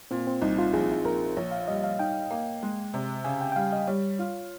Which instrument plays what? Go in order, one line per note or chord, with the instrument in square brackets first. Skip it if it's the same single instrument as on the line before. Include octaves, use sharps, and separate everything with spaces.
[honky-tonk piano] A#2 [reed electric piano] C4
[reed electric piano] C4
[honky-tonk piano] C2 [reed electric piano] D#4
[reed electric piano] F4
[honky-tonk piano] A#1 [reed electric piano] G#4
[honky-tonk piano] A#1 [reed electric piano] A#4
[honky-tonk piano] A#1 [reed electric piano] C#5
[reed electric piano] F5
[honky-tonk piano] G3 [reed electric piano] D#5
[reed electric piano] F5
[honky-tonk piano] D#4 [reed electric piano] G5
[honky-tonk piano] A#3
G#3
C3
[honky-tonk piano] C#3 [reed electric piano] G#5
[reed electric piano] G5
G5
[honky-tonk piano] G3 [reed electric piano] F5
[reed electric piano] D#5
[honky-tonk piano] G3 [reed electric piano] C#5
[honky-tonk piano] F4